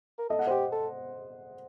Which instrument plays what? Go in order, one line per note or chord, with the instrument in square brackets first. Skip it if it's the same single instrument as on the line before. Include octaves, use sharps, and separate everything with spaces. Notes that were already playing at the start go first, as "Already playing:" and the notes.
[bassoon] A#4
[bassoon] A4 [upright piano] D#5
[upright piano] F#5
[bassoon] G4 [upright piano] C5 D#5
[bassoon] A4